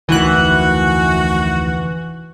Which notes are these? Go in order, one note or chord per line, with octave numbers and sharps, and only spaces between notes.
F1 D2 D#3 E3 F#4 F#6